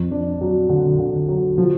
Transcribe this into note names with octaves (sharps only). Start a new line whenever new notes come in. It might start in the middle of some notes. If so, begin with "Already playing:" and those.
Already playing: F2
D4
F#3
D3
D3
F#3
F3